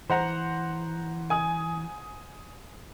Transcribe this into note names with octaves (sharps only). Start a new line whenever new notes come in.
E3 C5 F#5 A#5
G#5 D#6